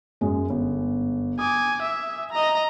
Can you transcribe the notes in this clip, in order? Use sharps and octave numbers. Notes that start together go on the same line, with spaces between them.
F#2 G#3
G1
G#5 D6 D#6
E5
D#5 A#5